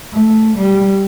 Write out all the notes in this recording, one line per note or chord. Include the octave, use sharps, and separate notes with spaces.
A3
G3